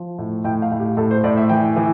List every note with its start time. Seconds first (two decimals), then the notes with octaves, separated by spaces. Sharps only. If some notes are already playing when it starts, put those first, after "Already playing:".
Already playing: F3
0.19 A2
0.44 A2 G5
0.62 F5
0.71 A2
0.80 G4
0.97 A2 A4
1.11 C5
1.24 A2 D5
1.37 E5
1.50 E3 G5
1.76 E3